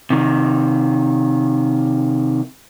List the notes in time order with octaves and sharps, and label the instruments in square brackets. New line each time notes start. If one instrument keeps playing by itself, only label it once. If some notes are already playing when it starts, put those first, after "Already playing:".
[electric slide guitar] C3 D#3